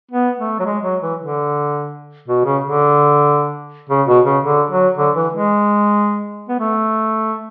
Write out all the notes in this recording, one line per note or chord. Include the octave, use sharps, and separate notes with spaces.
B3
A3
F#3
G#3
F#3
E3
D3
B2
C#3
D3
C#3
B2
C#3
D3
F#3
D3
E3
G#3
B3
A3